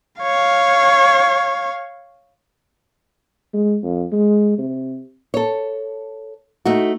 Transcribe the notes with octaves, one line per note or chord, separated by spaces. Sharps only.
C#5 F5
G#3
F2
G#3
C3
A4 C#5
A3 D#4 F#4